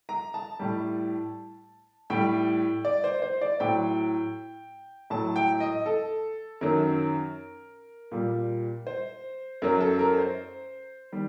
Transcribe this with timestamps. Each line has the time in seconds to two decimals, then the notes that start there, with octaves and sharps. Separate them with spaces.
0.09 A#5
0.34 A5
0.59 A2 G3
2.10 A2 G3 G5
2.85 D5
3.04 C5
3.22 C5
3.41 D5
3.60 A2 F#3 G5
5.10 A2 F#3 A5
5.36 G5
5.60 D#5
5.86 A4
6.61 F#2 D#3 F#3 A#4
8.11 A#2 G3
8.87 C5
9.62 F#2 F#3 A#4
9.81 A4
9.99 A#4
10.18 C5
11.12 D#3 G3